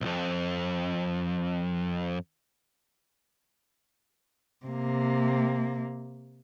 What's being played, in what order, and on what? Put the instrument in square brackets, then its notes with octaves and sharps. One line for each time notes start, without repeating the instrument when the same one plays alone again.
[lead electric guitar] B1 F2
[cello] C3 A#3